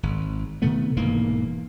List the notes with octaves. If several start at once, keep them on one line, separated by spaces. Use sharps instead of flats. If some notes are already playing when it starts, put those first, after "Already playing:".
G#1
C3 D#3 A3 B3
E1 G#2 E3 A#3